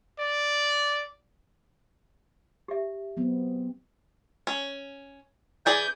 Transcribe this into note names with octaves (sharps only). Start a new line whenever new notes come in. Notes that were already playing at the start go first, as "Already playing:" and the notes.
D5
G4 E5
F#3 B3 C4
C#4
E3 G#4 D5 G6